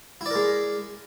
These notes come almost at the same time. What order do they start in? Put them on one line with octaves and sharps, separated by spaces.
E4 D5 A#4 G#3